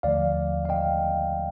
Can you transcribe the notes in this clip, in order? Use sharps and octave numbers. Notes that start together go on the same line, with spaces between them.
D#2 D3 F3 A3 D5 F5
F5
D#5 G5